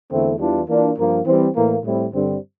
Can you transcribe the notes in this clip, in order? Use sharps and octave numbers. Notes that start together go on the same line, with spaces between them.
E2 D3 A3 C4 E4
E2 E3 G3 D4 F4
E3 A#3 D4 F4
G2 F3 A#3
E3 G3 C4
A2 E3 A#3
A2 G3 C4 E4
G2 D3 G3 C4